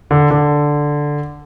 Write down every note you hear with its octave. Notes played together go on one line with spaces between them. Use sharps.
D3
D3